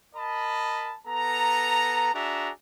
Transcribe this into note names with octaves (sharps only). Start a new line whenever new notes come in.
A#4 D#5 A5 B5
B3 A4 A#5
D4 F#4 G#4 E5 A#5